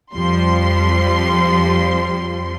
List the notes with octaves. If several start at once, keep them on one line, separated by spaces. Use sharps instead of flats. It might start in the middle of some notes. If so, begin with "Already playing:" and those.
F2 F3 G3 C6